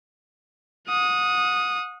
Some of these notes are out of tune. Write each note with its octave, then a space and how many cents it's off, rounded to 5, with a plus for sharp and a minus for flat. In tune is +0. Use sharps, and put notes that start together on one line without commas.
F#5 -35 D#6 +5